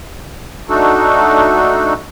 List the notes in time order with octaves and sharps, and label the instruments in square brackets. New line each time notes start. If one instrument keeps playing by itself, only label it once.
[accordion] A3 D4 D#4 F#4 A4